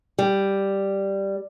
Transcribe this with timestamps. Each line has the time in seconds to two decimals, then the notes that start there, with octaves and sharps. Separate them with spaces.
0.19 G3